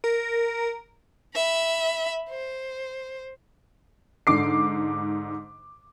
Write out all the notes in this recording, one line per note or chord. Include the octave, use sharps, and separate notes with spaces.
A#4
E5 B5
C5
G#2 D3 D6 C7